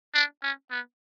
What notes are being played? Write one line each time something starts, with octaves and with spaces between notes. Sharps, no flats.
D4
C#4
B3